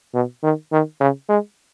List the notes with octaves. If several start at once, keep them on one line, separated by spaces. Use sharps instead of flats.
B2
D#3
D#3
C#3
G#3